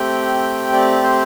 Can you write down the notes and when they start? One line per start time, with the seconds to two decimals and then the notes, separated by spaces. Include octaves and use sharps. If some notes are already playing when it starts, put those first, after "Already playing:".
Already playing: A3 C4 G4 G5
0.73 D5
1.03 C5